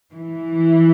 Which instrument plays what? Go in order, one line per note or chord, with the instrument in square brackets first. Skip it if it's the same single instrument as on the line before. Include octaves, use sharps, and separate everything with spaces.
[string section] E3